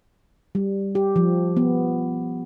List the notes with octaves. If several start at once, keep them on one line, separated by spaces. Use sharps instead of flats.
G3
G4
F3
B3